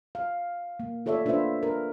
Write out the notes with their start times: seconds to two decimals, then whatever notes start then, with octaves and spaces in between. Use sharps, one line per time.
0.15 F5
0.80 A#3
1.06 F4 A4 C#5 D5 E5
1.25 A#3 D4 F4 B4 C5 E5
1.63 A#4